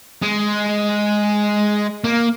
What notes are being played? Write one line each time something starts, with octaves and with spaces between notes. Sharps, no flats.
G#3
A#3